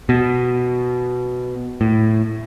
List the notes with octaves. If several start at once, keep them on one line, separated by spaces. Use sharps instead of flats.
B2
A2